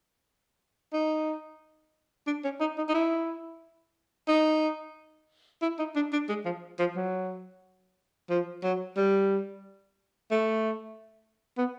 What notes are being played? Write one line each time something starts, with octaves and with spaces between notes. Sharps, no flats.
D#4
D4
C#4
D#4
D#4
D#4
E4
D#4
E4
D#4
D4
D4
G#3
F3
F3
F#3
F3
F#3
G3
A3
B3